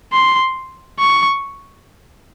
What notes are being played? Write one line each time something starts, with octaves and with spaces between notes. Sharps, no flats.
C6
C#6